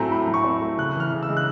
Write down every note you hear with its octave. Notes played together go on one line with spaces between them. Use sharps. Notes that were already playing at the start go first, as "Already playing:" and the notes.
Already playing: A2 F#3 A3 C4 G#5 A#5
A2 B5
F#3
C#6
C4
A3
C#3 F#6
E3 F6
C#3
E6
G#3
F#6